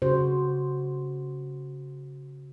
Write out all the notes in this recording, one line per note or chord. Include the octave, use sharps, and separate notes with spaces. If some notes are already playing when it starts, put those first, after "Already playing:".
C#3 F#4 G4 C5